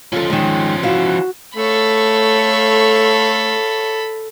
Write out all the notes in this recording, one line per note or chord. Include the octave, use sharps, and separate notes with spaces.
F3 C#4 F4 A4
D#3 G#3
E4 F#4 F5
A3 A4 C#5 F5 B5 C#6